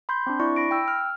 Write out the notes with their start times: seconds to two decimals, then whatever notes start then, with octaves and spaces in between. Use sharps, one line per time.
0.09 B5 C6 G6
0.27 C4 D4
0.40 E4 D5 C#6
0.56 B5 A#6 D7
0.71 G5 E6
0.88 F6